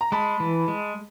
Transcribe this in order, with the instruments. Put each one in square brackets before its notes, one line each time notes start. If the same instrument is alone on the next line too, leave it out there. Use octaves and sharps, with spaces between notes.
[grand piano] A#5
[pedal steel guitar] G#3 [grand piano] A5 B5
[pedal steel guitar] E3
G#3